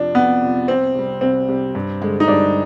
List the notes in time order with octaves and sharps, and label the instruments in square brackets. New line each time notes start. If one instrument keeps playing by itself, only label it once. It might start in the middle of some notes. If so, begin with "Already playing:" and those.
Already playing: [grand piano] F2 C3 F3 [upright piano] D4
[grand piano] F2 [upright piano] B3
[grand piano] C3 F3
[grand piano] C2 [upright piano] C4
[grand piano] C3 G3
[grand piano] C2 [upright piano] C4
[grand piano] C3 G3
G2
D3 G#3
[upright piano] D#4
[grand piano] G2 [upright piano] D4